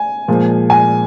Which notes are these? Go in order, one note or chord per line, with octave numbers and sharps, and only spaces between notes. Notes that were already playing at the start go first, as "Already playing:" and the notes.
Already playing: G#5
A#2 F3 G#3
G#5